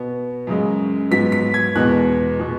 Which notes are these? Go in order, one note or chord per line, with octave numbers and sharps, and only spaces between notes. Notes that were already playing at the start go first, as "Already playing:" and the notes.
Already playing: B2 B3
F#2 C#3 G#3
G#2 F#3 B3 B6
B6
G#6
E2 B2 G#3 B3 F#6
B2 G#3 B3